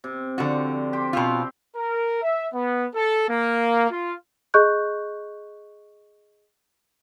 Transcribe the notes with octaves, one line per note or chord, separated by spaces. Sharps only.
C3
D3 F3 F#4 D5 G5
G4 C5
B2 C4 F4 C5 G5
A#4
E5
B3
A4
A#3
F4
G#4 D#5 C#6 F#6 G6